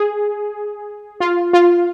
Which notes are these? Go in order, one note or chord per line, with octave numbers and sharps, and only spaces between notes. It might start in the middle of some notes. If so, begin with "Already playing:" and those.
Already playing: G#4
F4
F4